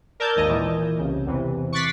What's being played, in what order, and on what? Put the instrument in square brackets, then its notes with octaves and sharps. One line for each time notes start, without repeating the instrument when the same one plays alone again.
[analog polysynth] A#4 D5 A5 E6 G6 G#6
G#1 D#2 D#5
A#2 E3
C2 C#3
E2 C3 E3
C#6 D6 F#6 A6 B6 C7